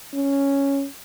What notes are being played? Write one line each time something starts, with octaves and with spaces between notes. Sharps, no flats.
C#4